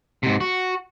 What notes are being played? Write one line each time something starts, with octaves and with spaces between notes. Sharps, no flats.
G#2 C3
F#4